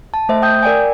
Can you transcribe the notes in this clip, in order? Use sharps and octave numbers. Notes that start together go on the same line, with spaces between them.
A5
A3 C5 E5
G5 D#6 G6
A#4 D5 G5 G#5